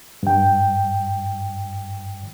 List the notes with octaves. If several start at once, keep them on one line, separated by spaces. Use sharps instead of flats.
G2 G5